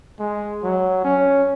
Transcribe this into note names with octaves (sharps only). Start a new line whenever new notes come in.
G#3
F#3
C#4